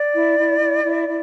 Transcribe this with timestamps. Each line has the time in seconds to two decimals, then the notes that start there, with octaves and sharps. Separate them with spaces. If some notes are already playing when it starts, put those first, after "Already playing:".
Already playing: D5
0.15 E4
0.38 E4
0.60 E4
0.84 E4
1.07 E4